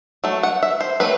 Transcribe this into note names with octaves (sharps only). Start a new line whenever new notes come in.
F#3 A3
F#5
E5
C5
F#3 A3 C4 B4